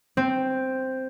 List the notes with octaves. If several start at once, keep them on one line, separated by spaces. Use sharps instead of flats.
C4